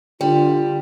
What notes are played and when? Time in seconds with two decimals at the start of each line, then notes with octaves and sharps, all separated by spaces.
0.21 D3 G3 F4